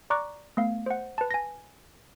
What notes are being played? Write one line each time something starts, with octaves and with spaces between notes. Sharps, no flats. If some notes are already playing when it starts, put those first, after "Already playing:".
D5 A#5 C#6 D6 F#6
A3 B3 F5
C5 F#5
B4 A5
G#5 A#6